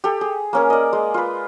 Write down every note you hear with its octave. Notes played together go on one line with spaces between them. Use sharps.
G4 A4
G#4
A#3 C#4 A#4
D5 D#5
G#3
F4 B4